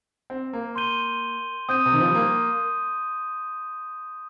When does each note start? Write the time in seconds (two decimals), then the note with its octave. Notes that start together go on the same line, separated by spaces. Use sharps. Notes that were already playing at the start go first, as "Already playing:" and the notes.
0.30 C4
0.53 A#3
0.76 C6 G6 D#7 G7
1.69 C4 D#6 G6 D#7
1.85 C3
1.93 D#3
2.00 F3
2.07 G3
2.15 A#3